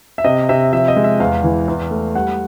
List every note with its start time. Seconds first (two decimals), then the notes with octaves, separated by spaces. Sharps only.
0.18 E5
0.24 C3 D#5
0.49 C3 E5
0.73 F3 E5
0.88 D#5
0.96 G#3
1.04 E5
1.20 E2 F5
1.44 E3
1.68 E2
1.91 A3
2.15 G3 F#5